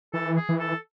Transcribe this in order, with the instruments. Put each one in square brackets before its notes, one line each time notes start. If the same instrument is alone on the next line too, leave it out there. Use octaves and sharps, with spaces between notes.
[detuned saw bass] E3 [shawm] A4
[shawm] G#4
[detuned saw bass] E3
[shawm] A4